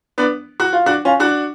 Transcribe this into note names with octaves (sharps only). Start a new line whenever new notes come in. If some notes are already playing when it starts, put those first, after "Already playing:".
B3 D4
F#4
F4
D4 F#4
C#4 F4
D4 F#4